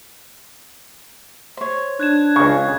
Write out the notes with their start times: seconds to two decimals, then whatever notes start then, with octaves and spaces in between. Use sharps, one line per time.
1.57 C5 C#5
2.00 D4 F#6 G#6 E7
2.36 C#2 C#3 C#6